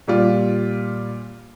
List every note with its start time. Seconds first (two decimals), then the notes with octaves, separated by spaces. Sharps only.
0.07 A#2 G3 F4